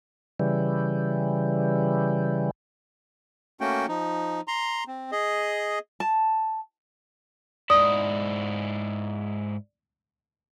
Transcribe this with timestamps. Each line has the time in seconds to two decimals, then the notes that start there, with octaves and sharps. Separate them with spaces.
0.40 C#3 E3 G3
3.61 A3 A#3 C#4 F#4 G5
3.88 F3 D#4
4.48 A#5 C6
4.88 C4
5.12 G#4 D#5
6.00 A5
7.70 G#2 E4 D5 D#6